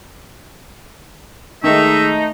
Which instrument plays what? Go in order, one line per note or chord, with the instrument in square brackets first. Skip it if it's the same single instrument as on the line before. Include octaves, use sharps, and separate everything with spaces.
[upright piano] D#3 G#3 [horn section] A3 D#4 [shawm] E5